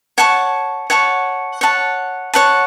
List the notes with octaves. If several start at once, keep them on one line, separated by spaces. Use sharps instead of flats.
C#5 F#5 A5 C#6
C#5 F#5 A5 C#6
C#5 F#5 A5
C#5 F#5 A5